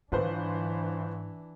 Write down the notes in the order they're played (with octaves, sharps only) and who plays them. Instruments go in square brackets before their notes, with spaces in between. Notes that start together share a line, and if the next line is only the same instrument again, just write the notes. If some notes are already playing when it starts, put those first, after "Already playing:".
[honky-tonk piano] G1 B4 C5 [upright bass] G#2 [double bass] E3 D4